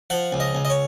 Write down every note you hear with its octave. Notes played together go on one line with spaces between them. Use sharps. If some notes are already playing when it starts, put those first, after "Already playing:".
F3 F#5
C#2
D#5
C#2
D#5
C#5